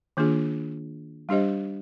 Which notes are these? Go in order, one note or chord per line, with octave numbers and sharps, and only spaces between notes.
D#3 A#3 D4 F4 G#4
G3 D4 G4 C5 D#5